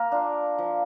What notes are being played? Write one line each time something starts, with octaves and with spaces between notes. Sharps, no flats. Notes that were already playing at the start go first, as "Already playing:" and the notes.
Already playing: A#3 A#4
D4 F4
F3